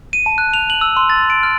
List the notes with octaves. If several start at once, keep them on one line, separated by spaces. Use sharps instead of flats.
D#7
A5
F#6
F7
F#7
E6
C6
A6
D7
F6